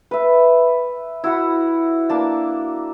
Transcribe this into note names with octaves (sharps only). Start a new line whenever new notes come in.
B4 E5
E4 F#4 F#5 B5
A#3 D4 A5